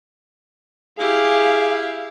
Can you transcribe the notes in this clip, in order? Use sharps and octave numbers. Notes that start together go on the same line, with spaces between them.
E4 G4 G#4 F5